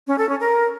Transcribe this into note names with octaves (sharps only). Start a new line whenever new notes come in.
C#4
A4
C#4
A#4